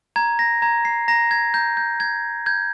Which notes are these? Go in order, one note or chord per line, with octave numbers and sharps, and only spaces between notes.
A#5 G#6
A#6
A#5 G#6
C7
A#5 A#6
G#6
A#5 G6
G6
G6 G#6
G6 G#6